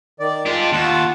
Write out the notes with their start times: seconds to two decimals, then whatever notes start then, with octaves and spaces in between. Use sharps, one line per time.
0.20 D#3 D5
0.46 G#3 D4 F4 G4
0.72 D#2 F4 F#5 A5